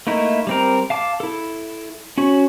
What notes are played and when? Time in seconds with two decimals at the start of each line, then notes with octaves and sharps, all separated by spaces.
0.07 A3 A#3 D#4 E4
0.47 G3 C4 A#4
0.90 F5 A5 D6
1.20 E4 A4
2.18 C#4 F#4 C#5